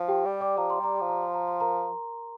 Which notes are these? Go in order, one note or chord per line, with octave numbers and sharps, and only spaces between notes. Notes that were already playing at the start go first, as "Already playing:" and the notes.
Already playing: F3
G4 G5
G3
D5 D6
F3 A#5
C6
G3 A#5
F3 C6
A#5
C6
A#5
C6
A#4 A#5